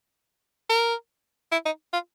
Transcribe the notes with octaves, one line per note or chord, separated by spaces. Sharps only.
A#4
E4
D#4
F4